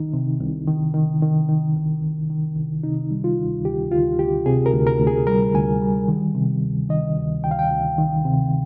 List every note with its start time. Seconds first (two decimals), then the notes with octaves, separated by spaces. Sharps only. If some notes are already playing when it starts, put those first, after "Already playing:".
Already playing: C2 D#3 D#4
0.13 C3
0.40 C2
0.67 D#3
0.94 D#3
1.22 D#3
1.49 D#3
1.76 C2
2.03 C2
2.30 D#3
2.57 C2
2.83 C3 D#4
3.11 G3
3.24 F4
3.38 D2
3.65 D2 G4
3.92 D2 F4
4.19 D2 G4
4.46 C3 G#4
4.66 A#4
4.73 D2
4.87 A#4
5.00 D2
5.07 G#4
5.27 G3 A#4
5.54 D2 G#5
5.81 G3
6.08 D#3
6.35 C3
6.62 D2
6.90 D#3 D#5
7.16 D2
7.44 D2 G5
7.51 F5
7.59 G5
7.71 D2
7.98 D#3
8.25 C3